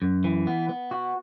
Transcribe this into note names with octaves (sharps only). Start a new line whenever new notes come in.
F#2
E3
B3
B3
F#4